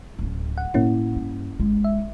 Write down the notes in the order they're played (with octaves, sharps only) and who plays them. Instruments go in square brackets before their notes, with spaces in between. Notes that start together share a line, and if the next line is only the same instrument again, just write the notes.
[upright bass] D1 C#4
[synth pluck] F#5
[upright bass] A2 [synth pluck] A#3 C#4 E4
[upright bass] G2
[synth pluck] G#1 [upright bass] G#3
[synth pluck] E5